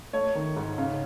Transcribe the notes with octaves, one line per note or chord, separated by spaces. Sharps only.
A3 C#5
D#3
G#2
C#3